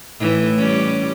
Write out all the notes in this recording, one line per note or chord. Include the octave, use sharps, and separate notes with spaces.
A2 E3
G3 C#4